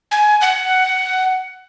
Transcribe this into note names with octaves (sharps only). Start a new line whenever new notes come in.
G#5
F#5